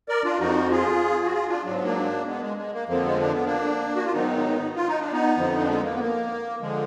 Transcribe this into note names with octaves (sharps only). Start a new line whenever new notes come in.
A#4 D5
D4 F4
F2 F3 D#4 F#4
F4 G#4
F#4
F4 G#4
D4 F4
G#2 F#3 D4
B3
A#3 D4
G#3 B3
G#3
G#3
A#3
F2 D3 F3 A#3
G#3 B3
D4
B3
A#3 D4
F#4
F4
G#2 D#3 F#3 B3 D#4
F4
D#4
D4
B3 D#4
F2 D3 F3
D4
G#3 B3
A#3
B3
A#3
D3 F3 G#3